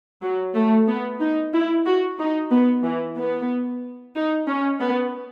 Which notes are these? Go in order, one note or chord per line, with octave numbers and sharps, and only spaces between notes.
F#3
A3
B3
D#4
E4
F#4
D#4
B3
E3
B3
D#4
C#4
B3